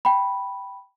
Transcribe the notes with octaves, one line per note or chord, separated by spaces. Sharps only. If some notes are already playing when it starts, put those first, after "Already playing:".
G5 B5